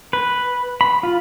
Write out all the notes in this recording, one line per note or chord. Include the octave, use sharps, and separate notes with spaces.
B4
B5
F4